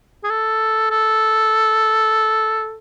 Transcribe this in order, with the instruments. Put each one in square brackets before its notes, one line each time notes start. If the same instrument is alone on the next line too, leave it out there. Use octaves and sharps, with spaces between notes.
[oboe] G#4
A4
A4